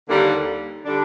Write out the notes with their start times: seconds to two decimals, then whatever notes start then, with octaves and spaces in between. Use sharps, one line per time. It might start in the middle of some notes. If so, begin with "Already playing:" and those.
0.09 D#2 D3 G3 A#3
0.84 D3 G3 D4